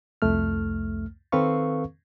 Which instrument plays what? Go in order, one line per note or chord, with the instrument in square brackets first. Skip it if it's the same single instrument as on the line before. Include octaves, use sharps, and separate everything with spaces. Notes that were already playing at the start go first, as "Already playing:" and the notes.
[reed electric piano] C2 F2 A3 F6
D#3 C4 A4 B4 F5 C#6